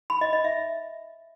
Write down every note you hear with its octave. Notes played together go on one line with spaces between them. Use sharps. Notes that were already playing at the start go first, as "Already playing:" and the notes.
B5
D#5
D#5
E5